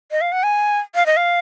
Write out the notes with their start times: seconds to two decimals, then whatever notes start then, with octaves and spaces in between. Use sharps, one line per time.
0.11 D#5
0.21 F5
0.32 F#5
0.43 G#5
0.95 F5
1.06 D#5
1.17 F5